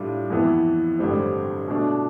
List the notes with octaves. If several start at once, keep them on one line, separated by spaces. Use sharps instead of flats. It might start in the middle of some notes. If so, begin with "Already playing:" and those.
Already playing: A2 G3 D4 F4
F2 E3 B3 E4 B4
A1 G2 D3 G3 C4
B2 A3 D4